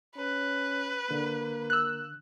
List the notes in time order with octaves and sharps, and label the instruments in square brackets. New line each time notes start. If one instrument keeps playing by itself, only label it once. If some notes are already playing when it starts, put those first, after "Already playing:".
[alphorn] C#4 [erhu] B4
[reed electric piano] D3 [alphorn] A#3
[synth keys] E6 F#6